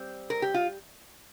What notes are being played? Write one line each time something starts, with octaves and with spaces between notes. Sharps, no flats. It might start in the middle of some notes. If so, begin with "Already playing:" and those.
Already playing: G3 C4
A#4
G4
F4